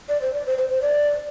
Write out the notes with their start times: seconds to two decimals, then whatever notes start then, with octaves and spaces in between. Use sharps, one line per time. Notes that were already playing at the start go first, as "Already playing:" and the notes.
0.09 D5
0.22 C5
0.34 D5
0.46 C5
0.58 C5
0.70 C5
0.82 D5